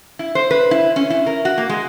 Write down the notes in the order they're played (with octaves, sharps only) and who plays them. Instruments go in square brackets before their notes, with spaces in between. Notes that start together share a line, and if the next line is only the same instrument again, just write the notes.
[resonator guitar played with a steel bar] E4
C5
B4
E4
C#4
E4
A#4
F#4
A#3
G#3